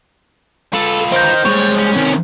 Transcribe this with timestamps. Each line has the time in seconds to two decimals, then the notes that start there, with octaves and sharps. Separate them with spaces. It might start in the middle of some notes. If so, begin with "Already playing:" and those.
0.74 F4 A4 B4
1.12 D#4 A#4 C5 G6
1.45 G3 G#3 C#5
1.78 C#4
1.95 C3 D#3